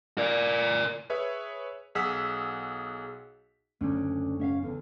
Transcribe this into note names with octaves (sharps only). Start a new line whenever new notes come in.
A#4 D5
G#4 B4 C#5 E5
B1 G#4 F#5 E6 B6
F#1 D2 C#4 D4
C#4 E5 F5
E2 D3